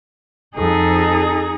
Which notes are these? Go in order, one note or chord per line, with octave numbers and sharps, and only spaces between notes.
F2 D#4 G#4 A4